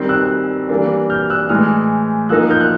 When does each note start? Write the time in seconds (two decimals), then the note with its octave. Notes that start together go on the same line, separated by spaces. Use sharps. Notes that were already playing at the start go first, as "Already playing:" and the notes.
Already playing: D#3 G3 C4
0.09 E6 F#6
0.69 E3 G3 A#3 D4
1.10 F6 G6
1.30 E6 F#6
1.49 A2 E3 G#3 D#6 F6
2.29 F3 A#3 D#4 E6 F#6
2.50 F6 G6
2.60 F#6